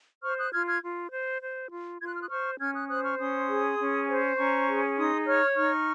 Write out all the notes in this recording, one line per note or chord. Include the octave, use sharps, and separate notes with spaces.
C5 C#6 F6
D#6 F#6
F4 F6 G#6
F6 G#6
F4
C5
C5
F4
F4 G#6
F#6
F6
D#6 F#6
C5 C#6 F6
C#4 F6 G#6
D#6 F#6
C5 D#6 F#6
C#6 F6
C#4 C6 D#6
G#4
C#4
C5
C#4 A#5 C#6
G#4
D#4 C6 D#6
C#5 C#6 F6
D#4 C#6 F6